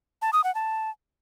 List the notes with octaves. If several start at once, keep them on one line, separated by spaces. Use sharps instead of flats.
A5
D#6
F#5
A5